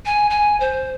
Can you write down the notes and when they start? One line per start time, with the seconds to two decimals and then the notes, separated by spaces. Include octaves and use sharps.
0.06 G#5
0.30 G#5
0.60 C5